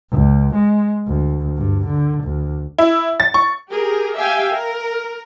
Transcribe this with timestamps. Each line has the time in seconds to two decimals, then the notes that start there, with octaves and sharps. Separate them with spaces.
0.11 C#2
0.55 G#3
1.08 D2
1.57 G2
1.87 D3
2.24 D2
2.78 E4
3.20 A6
3.34 C#6
3.69 G4 G#4 A#4
4.16 G4 E5 F5 G5 G#5
4.52 A#4